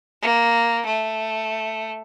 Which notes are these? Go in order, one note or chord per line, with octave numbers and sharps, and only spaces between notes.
A#3
A3